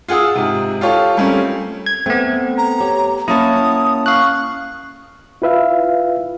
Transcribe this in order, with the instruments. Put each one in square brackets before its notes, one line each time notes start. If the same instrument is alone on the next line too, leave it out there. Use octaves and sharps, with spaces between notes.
[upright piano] F4 G#4 F#5 D#6 E6
G#2 C3
F4 G4 A4 C#5 F5
G3 A3 C4 C#4 A#4
[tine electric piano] G#6
[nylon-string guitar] A3 [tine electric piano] B3 C4
[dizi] A#5
[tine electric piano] G4 [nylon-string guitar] C#5
[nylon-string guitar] A#3 C#4 F#5 [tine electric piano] E4 A5 [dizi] D#6
[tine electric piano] F5 F#6 [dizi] C#6
[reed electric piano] E4 F4 B4 E5 F5